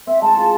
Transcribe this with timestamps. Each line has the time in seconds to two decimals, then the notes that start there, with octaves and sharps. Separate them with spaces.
0.07 C4 E5
0.22 G#3 A5
0.36 F4